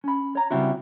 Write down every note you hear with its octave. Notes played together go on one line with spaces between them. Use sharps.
C#4 B5
C#5 A#5
C#3 G3 A#3 C4 E4 F#4